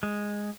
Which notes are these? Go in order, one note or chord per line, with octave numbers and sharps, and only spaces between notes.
G#3